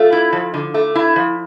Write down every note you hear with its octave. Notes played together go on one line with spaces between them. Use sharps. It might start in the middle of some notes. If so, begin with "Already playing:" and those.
Already playing: A3 F4
E4
F3
D3
A3
E4
F3